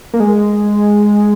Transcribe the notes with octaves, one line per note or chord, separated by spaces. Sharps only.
A#3
G#3